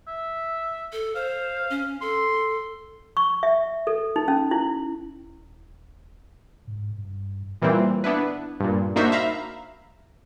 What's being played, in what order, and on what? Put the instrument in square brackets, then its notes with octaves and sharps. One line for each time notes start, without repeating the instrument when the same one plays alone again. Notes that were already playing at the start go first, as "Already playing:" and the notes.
[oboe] E5
[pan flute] A4
[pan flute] C5 [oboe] F5
[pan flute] C#4
[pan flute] A4 [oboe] C6
[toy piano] C#6
E5
A4
D#4
C#4
E4
[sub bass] D#1
G#2
G2
[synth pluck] A#2 E3 G3 A#3 C4
B3 D4 E4 B4
G2 A#2
A#3 D4 D#4 F#4 C5 E5
E5 F5 A#5 B5